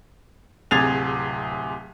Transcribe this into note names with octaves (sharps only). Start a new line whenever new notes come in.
D1 C3 G#4 G#6 A6 F7